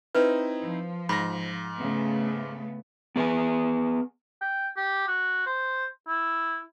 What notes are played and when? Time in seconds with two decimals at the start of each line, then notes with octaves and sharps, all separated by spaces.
0.15 C4 D#4 E4 B4
0.60 F3
1.09 G#2 B5 A#6
1.77 C#3 A3 B3
3.16 B3 G#4 B4 D#5 G#5
4.41 G5
4.76 G4
5.08 F#4
5.46 C5
6.08 E4